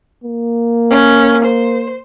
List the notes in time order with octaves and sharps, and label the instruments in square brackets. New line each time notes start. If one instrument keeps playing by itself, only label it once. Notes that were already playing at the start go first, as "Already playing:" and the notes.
[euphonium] A#3
[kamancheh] C#4
C5